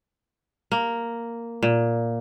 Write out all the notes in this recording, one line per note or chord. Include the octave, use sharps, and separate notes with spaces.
A#3
A#2